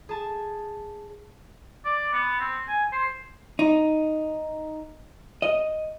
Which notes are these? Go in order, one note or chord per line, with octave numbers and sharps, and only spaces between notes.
G#4 A5
D5
B3
C4
G#5
C5
D#4
D#5